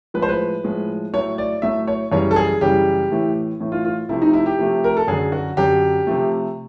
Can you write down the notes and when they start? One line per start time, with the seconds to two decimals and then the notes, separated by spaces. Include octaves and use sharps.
0.14 A2 F3 G#3 B4
0.22 C5
0.29 B4
0.64 A2 F3 G#3
1.14 A2 F#3 A3 C#5
1.38 D5
1.62 A2 F#3 A3 E5
1.87 C#5
2.12 F#2 C#3 E3 G3 C#5
2.31 A4
2.36 G#4
2.61 F#2 C#3 E3 G3 G4
3.11 A2 E3 A3
3.60 A2 E3 A3
3.72 F4
3.85 F4
4.09 C3 F3 A3 E4
4.22 D#4
4.33 E4
4.46 G4
4.59 C3 F3 A3
4.84 A#4
4.97 A4
5.08 F#2 D3 F#3 G#4
5.32 F#4
5.57 F#2 D3 F#3 G4
6.07 C3 F3 A3